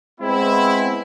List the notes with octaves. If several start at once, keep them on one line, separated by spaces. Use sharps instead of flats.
G#3 B3 C4 E4